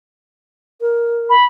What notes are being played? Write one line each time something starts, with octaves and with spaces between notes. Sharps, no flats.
A#4
B5